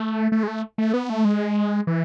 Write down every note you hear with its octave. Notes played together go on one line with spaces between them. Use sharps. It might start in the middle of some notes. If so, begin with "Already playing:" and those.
Already playing: A3
A3
G#3
A3
A3
B3
A3
G#3
E3